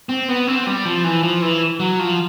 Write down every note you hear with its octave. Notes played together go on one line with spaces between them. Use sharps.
C4
B3
C4
G3
F3
E3
F3
E3
F#3
F3